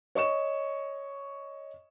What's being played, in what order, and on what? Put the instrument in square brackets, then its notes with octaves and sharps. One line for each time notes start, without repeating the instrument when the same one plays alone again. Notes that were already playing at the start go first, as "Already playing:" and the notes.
[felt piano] C#5 D#5 C#6 E7